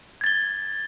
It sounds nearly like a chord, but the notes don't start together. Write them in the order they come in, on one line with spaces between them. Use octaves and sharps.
G#6 A6 G7